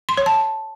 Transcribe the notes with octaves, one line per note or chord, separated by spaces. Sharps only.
C6
C#5
A5